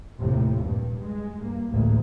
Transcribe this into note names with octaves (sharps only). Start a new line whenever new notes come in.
F1 D#2 A2 C3
G2 A#2
G#3
G2 A#3
A1 D2 G#2 A#3